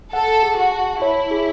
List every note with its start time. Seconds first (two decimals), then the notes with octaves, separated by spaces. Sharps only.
0.13 A4 F#5
0.43 G#4
0.58 F#4
0.72 A5
1.02 E4 C#5
1.31 G#4